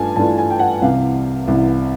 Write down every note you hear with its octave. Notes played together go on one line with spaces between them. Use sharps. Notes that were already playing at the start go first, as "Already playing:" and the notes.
Already playing: G2 A3 D4 F4 G#5 A5
G2 E3 A3 D4 F4 A5
G#5
G5
F#5
C2 C3 E3 F5
C2 C3 E3